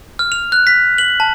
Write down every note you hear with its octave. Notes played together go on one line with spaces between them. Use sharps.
F6
F7
F#6
B6
F#7
A5